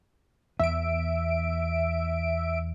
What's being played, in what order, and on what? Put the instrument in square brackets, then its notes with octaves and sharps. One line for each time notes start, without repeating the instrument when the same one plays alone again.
[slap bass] E2 B3 [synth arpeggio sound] E5 D7